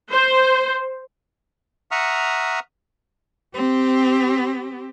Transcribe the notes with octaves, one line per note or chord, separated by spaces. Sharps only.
C5
E5 F#5 A#5 C#6 D#6 F6
C4 G4